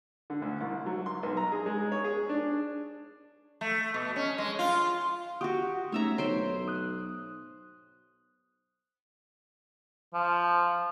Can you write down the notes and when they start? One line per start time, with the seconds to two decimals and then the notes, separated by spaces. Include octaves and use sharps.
0.30 D3
0.42 D2
0.60 C2
0.86 F#3
1.06 C6
1.23 B1
1.37 A#5
1.52 G#4
1.66 G#3
1.92 C#5
2.04 G#4
2.29 D4
3.61 A3
3.94 B2
4.16 C#4
4.38 G#3
4.59 F4
5.41 F#4 G4 F#5 C#6 D#6
5.92 A3 C#4 D#4 C#5 E5 A#5
6.18 B1 C5 C#5 G5 C6
6.68 D#6 F#6
10.14 F3